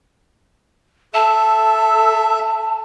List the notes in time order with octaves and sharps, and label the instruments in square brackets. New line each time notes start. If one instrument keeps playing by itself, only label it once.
[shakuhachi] A4 [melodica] E5 [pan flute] A5